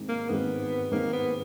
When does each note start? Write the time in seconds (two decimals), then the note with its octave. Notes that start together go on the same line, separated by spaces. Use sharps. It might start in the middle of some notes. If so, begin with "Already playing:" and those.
Already playing: G#2 D#3 G#3 C4
0.09 A#3
0.29 G#2 D#3 G#3 B3 C4
0.92 G#2 D#3 G#3 A#3 C4
1.13 B3